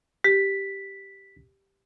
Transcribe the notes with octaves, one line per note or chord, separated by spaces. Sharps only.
G4 B6